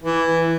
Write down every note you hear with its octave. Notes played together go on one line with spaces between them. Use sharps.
E3